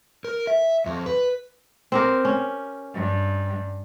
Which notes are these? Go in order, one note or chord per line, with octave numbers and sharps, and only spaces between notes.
A#4
E5
F2
B4
C4 G4 A#4
C#4
G2